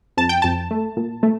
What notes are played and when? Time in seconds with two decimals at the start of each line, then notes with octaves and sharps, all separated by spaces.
0.17 F2 A5
0.29 G5
0.42 F2 A5
0.71 A3
0.97 A#2
1.23 A3